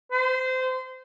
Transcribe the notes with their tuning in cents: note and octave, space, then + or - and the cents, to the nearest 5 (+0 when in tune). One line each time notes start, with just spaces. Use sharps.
C5 -25